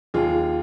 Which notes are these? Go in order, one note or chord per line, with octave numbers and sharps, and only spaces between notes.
D#2 F4 G#4